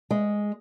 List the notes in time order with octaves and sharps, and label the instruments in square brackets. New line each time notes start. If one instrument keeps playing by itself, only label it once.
[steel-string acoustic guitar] G#3